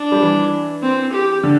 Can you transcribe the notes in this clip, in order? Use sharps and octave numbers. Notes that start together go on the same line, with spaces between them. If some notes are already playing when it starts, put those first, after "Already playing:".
Already playing: D4
G3
E3
C4
G4
D3